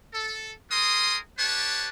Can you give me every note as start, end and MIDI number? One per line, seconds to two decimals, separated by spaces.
0.13 0.51 69
0.70 1.18 55
0.70 1.18 68
0.70 1.18 70
0.70 1.18 84
0.70 1.18 87
1.38 1.89 62
1.38 1.89 67
1.38 1.89 71
1.38 1.89 73
1.38 1.89 81